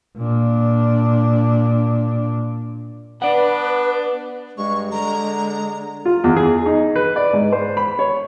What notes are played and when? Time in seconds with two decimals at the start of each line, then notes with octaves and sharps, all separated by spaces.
0.17 A#2 D4
3.22 B3 D4 B4 D5 F#5
4.58 G2 G#3 C#6
4.91 D3 A#5
6.05 F4
6.24 E2
6.37 G#4
6.66 D#4
6.96 B4
7.16 D5
7.33 G#2
7.52 C5
7.77 B5
7.99 C#5